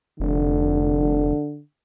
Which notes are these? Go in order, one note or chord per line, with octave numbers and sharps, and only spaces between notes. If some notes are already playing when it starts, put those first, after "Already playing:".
F1 D3